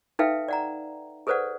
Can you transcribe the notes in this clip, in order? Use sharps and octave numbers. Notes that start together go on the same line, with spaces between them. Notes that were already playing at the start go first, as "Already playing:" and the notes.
D#4 A4 B4 E5 F5 G5
D5 F#5 A#5
G#4 A4 B4 C5 D5 F#5